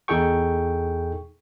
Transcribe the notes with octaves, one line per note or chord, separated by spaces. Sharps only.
E2 D#4 G#4 A4 G5 C#6